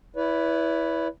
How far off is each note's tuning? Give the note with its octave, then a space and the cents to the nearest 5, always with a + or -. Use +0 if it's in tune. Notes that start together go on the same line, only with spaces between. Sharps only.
E4 +0 B4 +0 D5 -45